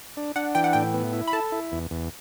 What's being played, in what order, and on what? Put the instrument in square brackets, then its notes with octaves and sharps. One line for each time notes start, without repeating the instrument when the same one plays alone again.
[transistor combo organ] D4
[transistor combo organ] D4 [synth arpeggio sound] F#5
[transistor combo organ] E3 [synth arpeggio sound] G5
[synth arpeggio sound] F#5
[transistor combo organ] A2 [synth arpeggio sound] G5
[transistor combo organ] B3
E4
[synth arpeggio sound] B5
[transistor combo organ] A4 [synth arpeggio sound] A5
[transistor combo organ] E4
E2
E2